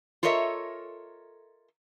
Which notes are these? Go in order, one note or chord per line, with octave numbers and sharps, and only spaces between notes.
F4 A4 A#4 C#5 D#5 E5